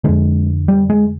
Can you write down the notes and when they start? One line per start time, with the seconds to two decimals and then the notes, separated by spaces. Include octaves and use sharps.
0.04 F2 D3 G#3
0.68 G3
0.90 G#3